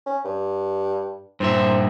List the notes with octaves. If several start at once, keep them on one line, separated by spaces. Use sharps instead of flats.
C#4
G2
G2 A#2 C5 E5